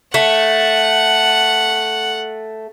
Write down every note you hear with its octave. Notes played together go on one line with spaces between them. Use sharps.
A3 F#5